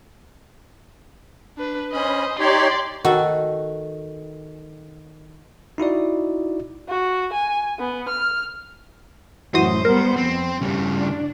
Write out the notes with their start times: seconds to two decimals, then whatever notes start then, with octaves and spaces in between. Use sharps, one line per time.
1.58 D4 B4
1.92 C#4 C5 D#5 B5
2.39 D#4 G4 C#5 D5 C6
3.05 D#3 F#4 A4
5.78 D#4 E4 F#4 D5
6.88 F#4
7.33 G#5
7.79 B3
8.08 F6
9.54 F#2 A2 E3 F#4 C5 D#6
9.85 G3 B3 A#4
10.17 F2 C4
10.62 G2 C#3 G3
10.98 D4